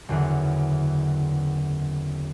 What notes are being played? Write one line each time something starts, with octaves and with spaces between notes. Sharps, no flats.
F#1 E2 D3